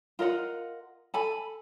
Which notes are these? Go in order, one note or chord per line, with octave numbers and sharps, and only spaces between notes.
F4 A#4 D#5 F#5
A4 G#5 B5